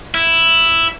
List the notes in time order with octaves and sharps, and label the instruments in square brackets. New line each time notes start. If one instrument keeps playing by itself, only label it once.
[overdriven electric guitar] E4